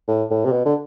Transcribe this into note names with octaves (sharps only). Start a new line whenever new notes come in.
A2
A2
C3
B2
D3